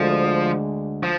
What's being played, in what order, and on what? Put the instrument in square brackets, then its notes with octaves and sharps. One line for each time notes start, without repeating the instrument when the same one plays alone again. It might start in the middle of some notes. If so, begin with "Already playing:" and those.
Already playing: [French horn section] D2 D3 G#3 [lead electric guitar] F3
[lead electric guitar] F3